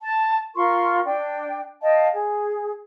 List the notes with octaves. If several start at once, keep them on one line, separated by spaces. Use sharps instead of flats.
A5
F4 A#4 C6 C#6
D4 G5
D#5 F5 G5 A5
G#4